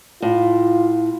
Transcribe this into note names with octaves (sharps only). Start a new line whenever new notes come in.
A2 F4